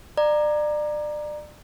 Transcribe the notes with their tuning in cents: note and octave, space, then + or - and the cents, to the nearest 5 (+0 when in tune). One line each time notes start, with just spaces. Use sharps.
D5 +30 A#5 +0